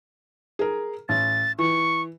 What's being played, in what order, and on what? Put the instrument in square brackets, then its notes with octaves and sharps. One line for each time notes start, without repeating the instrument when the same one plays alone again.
[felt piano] G#4 A#4
[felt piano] A1 [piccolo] A6
[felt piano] E3 [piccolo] C#6